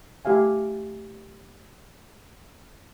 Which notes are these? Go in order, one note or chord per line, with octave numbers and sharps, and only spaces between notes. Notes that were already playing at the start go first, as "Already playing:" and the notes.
A3 G4 E5 F5 G#5